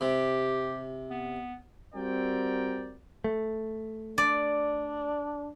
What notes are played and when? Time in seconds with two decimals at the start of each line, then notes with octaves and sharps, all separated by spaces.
0.01 C3 G4
1.10 B3
1.94 G3 C4 F#4 A#4 D5 G5
3.24 A3
4.18 D4 D5